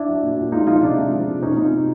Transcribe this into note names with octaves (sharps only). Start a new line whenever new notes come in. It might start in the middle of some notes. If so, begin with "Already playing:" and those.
Already playing: D4 E4
F#3
A#2
A#2
G#3 D#4 F4
F3 D#4 F4
C3 D4 E4
G#3
F3
C3
C3 C#4 D#4
C3 D#4 F4
C3